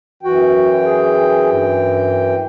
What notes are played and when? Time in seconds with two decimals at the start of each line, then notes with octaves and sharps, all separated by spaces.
0.23 F#2 E3 F#4 G5
0.82 G#4
1.53 G2